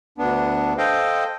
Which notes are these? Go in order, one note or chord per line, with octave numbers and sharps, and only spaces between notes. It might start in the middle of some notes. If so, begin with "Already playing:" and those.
D2 B3 D4
A4 C5 D#5 F5 G5